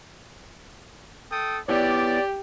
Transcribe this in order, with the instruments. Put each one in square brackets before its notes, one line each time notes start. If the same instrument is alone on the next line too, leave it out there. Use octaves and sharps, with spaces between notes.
[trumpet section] A4 G5 D#6
[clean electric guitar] B3 E4 C#5 [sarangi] G4 [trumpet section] D5